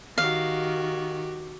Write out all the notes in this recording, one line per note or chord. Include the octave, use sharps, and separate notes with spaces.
D#3 F#4 G4 F5